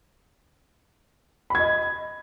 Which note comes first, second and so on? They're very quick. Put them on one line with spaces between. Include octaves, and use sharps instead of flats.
B5 G#6 D#5